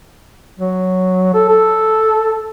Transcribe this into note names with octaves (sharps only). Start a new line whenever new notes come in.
F#3
A4
A4